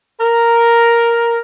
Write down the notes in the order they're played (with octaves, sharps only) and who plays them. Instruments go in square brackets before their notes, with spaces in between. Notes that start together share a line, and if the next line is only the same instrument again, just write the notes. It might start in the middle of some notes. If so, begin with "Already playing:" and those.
[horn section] A#4